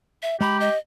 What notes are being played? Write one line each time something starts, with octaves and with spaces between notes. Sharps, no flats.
E5
G#3 G4 A#5 B5
D#5